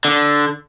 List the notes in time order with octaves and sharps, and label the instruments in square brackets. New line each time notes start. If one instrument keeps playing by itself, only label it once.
[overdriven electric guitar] D3